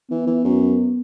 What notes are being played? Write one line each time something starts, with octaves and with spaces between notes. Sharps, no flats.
E3 B3
E3
F#2